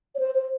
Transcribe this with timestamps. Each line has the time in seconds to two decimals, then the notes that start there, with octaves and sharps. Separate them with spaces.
0.15 C#5
0.19 C5
0.35 C5